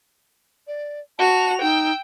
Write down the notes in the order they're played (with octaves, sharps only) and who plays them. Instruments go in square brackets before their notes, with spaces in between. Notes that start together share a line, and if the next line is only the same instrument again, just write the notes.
[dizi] D5
[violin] F#4 F7 [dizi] A5
[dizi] D#4 [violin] G5 E6